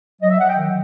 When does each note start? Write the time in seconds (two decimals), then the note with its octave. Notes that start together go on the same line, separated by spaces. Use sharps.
0.21 F#3 D#5
0.30 E5
0.39 F#3 F#5
0.48 G5
0.57 D#3